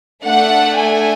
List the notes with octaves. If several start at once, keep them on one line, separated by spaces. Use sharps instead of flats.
A3 D4 A4 F#5
G#5